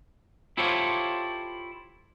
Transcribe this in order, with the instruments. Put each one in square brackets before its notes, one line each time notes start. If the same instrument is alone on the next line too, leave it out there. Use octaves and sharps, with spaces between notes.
[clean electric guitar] E4 F4 G4 A4 C5 C#5